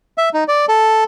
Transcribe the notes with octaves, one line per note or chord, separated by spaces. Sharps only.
E5
D#4
D5
A4